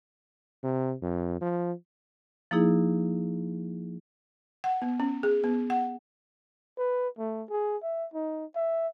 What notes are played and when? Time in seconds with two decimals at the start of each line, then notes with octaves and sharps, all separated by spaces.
0.63 C3
1.02 F2
1.41 F3
2.51 F3 A#3 D#4 E4 G#4
4.64 F#5
4.82 B3
5.00 C#4
5.23 G#4
5.44 B3
5.70 F#5
6.78 B4
7.18 A3
7.49 G#4
7.83 E5
8.14 D#4
8.56 E5